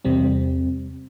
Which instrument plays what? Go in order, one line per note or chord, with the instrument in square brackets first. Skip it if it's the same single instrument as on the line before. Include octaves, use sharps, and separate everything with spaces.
[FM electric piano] E2 C3 G3 C4